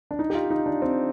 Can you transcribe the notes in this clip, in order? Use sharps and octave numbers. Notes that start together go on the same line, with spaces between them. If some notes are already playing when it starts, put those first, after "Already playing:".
D4
D#4
G4
F4
D#4
D4
C4